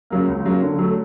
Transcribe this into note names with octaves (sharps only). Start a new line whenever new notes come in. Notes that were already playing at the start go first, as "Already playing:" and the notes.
C#3 F#3 A#3
C#2
C#3 F#3 A#3
D3
F#3 A3